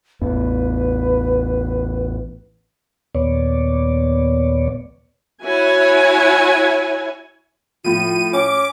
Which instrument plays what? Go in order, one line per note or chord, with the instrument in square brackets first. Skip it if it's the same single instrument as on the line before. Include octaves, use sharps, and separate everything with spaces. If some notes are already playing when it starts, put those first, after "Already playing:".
[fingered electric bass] A1 E2 [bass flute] B4
[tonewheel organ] D#2 A#2 B3 C#5 D5
[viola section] E4 F#4 C#5 G#5
[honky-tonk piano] A2 F3 [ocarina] F4 [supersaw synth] D#7
[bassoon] C#4 [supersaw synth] D6